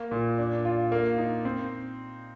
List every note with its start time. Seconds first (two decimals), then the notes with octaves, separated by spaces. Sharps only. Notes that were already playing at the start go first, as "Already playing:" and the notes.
Already playing: A#3
0.11 A#2
0.38 D4
0.65 F4
0.92 A#3
1.18 D#4
1.45 C4